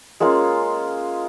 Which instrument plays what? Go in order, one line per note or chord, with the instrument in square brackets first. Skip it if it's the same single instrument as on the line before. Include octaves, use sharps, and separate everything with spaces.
[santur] G#3 A#3 C#4 F4